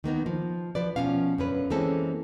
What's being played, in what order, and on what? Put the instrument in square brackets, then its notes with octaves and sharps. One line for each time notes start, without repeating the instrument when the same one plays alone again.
[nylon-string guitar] D#3 A#3 B3 D#4
F3
F3 B4 D5
B2 D3 F3 C#4 F5
F#2 D3 C#4 B4
E3 G#3 A#3 C4 C#4 A4